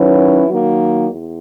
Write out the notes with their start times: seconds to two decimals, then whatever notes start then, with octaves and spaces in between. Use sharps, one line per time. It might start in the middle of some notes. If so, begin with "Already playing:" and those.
Already playing: D#3 F#3 C#4 E4 B4
0.47 D#3 F#3 A#3
1.10 E2